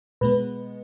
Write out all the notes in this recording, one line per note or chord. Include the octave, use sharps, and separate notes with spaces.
B2 G#3 B3 B4